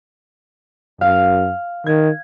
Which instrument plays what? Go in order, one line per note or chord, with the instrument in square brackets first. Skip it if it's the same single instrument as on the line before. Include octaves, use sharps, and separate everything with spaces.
[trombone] F#2 [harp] F5
[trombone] D#3 [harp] G#6